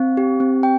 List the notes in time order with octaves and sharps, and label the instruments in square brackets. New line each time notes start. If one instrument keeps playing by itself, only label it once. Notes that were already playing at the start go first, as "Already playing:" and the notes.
Already playing: [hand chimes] C4 F5
G4
C4
G5